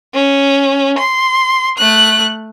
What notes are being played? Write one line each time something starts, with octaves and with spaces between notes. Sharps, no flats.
C#4
C6
A3 F#6